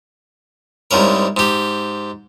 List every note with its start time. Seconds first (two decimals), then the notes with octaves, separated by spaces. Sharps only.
0.91 C2 G#2 C#3 A#4
1.37 G#2 G4